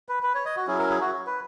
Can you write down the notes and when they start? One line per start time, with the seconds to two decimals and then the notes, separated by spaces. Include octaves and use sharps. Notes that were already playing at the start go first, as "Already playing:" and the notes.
0.09 B4
0.23 B4
0.35 C#5
0.46 D#5
0.56 F#4
0.67 F#3 C#4 E4 G#4
0.79 A#4
0.90 G#4
1.01 F#4
1.27 B4